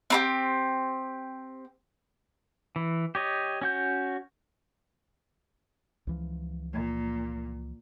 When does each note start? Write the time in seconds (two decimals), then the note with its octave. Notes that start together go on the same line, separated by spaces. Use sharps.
0.10 C4 D#4 G4
2.76 E3
3.15 G4 C#5 D#5
3.61 C#4 F#4 G6
6.07 C#2 E3 F3
6.73 A#2